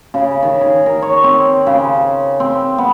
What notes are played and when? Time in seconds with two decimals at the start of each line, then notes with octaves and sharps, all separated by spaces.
0.14 C#3
0.43 D#3
0.61 G#4
0.86 A#4
1.02 C#5
1.24 C4
1.67 C#3
2.40 C4
2.78 B3